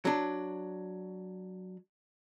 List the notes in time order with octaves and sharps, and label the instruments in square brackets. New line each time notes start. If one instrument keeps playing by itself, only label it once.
[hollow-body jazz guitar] F#3 D4